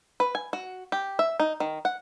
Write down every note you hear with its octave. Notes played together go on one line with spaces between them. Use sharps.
B4
G#5
F#4
G4
E5
D#4
D#3
F#5